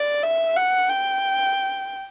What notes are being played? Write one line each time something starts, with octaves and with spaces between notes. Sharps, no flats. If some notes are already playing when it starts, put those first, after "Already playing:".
Already playing: D5
E5
F#5
G5